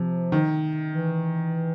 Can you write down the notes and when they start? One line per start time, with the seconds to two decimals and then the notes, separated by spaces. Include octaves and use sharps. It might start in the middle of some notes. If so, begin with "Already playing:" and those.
Already playing: C3 F3
0.32 D#3
0.93 E3